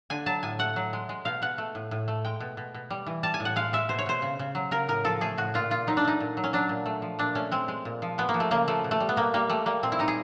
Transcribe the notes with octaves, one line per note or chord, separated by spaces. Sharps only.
D3 G#5
F#3 A5
A2 G#5
A3 F#5
F#3
G#3
G#3
B2 F5
B2 F#5
A3
A2
A2
A3
G#3 G5
B2
B2
B2
G3
E3
G3 A5
G#5
A2
F#5
G#3 F5
G#3 E5
B2 C5
C#5
B2 C5
C#3
C#3
F#3
C#3 A#4
A2 A#4
F3 A4
A3 G#4
A2 F#4
A#2 F4
A#2 F4
F#3 D#4
D4
A3 D#4
A#2
F#3
C#4
F#3 D4
A#2
A3
F3
A#2 D4
A3 C#4
G#3 C4
G#3
A#2
F3
G#3 B3
A#3
F3
A3
C#3 A#3
F3 A3
B2
A3
G3
B3
B2 A#3
G3 A#3
G3 A3
G3 A#3
A#2 C4
E4
G3 D#4
G#4